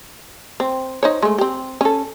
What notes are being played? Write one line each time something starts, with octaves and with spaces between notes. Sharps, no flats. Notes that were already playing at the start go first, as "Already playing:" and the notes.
C4
D#4 C5 C#5
G#3 A3
C4 G4
C#4 A4